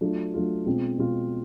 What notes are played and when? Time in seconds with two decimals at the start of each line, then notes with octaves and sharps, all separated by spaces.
0.01 F#3 A3 D4 F4
0.34 F#3 A3 D4 F4
0.66 B2 G#3 C4 F4
0.98 B2 G#3 C4 F4